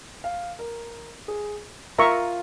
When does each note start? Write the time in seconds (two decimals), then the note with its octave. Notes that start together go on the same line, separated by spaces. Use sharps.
0.24 F5
0.59 A#4
1.28 G#4
1.99 F4 A#4 E5 A#5 C#6